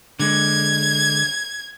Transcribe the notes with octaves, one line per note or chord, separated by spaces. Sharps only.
D3 G#3 G#6